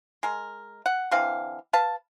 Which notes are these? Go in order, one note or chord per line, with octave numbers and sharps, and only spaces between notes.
G#3 A#4
F#5
D3 E3 C4 F5
B4 F5 A5